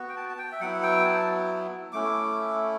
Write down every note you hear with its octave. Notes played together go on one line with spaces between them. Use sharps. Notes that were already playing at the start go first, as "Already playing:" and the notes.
Already playing: B3 F#4
G5
A5
A5
G5
E5
F#3 B3 E4 F#5
G5
A5
A3 C#4 E4 D6